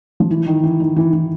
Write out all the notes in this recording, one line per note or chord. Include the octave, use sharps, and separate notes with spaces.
F3
E3
D#3
E3
D#3
E3
E3